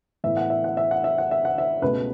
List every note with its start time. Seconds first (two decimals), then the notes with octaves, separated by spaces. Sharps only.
0.24 A2 E3 B3 E5
0.37 F#5
0.50 E5
0.64 F#5
0.77 E5
0.91 F#5
1.04 E5
1.18 F#5
1.31 E5
1.45 F#5
1.58 E5
1.82 C#2 B2 A3 B4